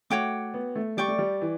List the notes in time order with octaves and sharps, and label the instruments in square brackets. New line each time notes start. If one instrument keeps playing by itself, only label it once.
[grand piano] A3 [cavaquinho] F#4 C#5 G5 D6
[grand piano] B3
A3
[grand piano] G3 [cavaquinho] D5 G5 C#6
[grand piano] A3
G3
E3